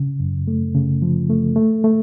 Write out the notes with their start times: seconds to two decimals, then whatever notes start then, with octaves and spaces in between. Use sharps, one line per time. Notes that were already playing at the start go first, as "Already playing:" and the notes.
Already playing: C#3
0.20 F#2
0.47 A3
0.75 C#3
1.02 F3
1.29 A3
1.56 A3
1.84 A3